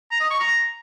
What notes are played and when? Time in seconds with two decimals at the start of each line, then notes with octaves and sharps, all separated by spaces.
0.11 A#5
0.21 D#5
0.30 C#6
0.40 A#5